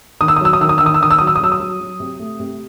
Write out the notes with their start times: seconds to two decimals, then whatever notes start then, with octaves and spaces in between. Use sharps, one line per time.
0.20 D#3 D#6
0.28 E6
0.36 D#6
0.41 F#3 E6
0.53 D#6
0.60 D#3 E6
0.69 D#6
0.78 D#3 E6
0.86 D#6
0.94 E6
1.01 D#3 D#6
1.11 E6
1.18 F#3 D#6
1.27 E6
1.36 D#6
1.40 F#3 E6
1.52 D#6
1.60 F#3
1.80 F#3
2.00 C3
2.19 A3
2.40 C3